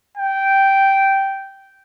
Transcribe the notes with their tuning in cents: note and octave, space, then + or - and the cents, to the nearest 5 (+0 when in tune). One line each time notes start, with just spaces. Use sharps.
G5 -10